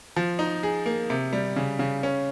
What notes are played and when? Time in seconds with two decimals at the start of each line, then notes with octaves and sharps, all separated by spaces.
0.16 F3
0.39 D#4
0.63 G#4
0.86 A#3
1.10 C3
1.33 G3
1.56 C#3
1.79 C#3
2.03 C#4